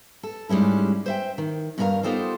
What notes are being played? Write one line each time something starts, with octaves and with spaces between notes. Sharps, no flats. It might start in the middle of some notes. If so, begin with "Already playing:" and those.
A4
G#2 G3 G#3 C#4 E4
C5 E5 G5
D#3
G2 C#4 D#4 G#4 A#4 F5
B3 D#4 F4 G4 A4 C5